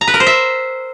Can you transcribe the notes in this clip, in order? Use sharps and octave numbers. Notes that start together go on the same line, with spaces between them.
A#5
B4
A#4
C5
E5